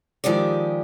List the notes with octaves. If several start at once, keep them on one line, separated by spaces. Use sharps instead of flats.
D#3 F3 G#3 G4 D5